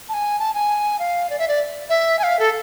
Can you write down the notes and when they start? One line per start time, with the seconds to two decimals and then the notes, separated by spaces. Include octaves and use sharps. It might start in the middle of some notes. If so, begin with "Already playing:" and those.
0.09 A5
0.14 G#5
0.39 A5
0.54 G#5
0.99 F5
1.30 D5
1.39 E5
1.48 D5
1.89 E5
2.19 G#5
2.23 F5
2.39 A4